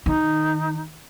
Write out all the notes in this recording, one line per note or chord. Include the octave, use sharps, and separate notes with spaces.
D#3 D#4